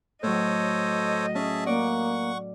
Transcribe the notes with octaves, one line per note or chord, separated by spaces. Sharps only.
A2 F#3 A4 C5 C#5 D#5
C#4 G#4 E5 A5
A#3 D5 F#5 C#6